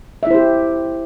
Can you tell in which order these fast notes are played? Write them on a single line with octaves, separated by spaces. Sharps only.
E5 E4 C5 G4